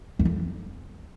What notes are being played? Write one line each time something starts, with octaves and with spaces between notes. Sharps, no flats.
F#2
F2